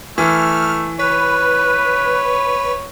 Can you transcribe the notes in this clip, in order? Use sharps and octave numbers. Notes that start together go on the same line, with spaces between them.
E3 A3 F6
B4 C#5 F#6